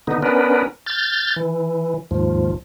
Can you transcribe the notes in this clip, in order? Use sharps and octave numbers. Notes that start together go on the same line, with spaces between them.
D3 B3 D#4
B3 C#4 D4 A#4 B4
F6 G6 A6
E3
D#2 G#2 F3